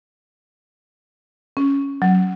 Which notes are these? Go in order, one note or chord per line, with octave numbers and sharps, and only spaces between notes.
C#4
F#3